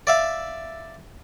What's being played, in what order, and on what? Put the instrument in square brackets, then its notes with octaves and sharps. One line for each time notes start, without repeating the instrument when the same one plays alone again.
[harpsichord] D5 E5 F5